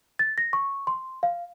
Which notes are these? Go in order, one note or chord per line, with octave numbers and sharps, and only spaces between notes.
A6
A#6
C#6
C6
F5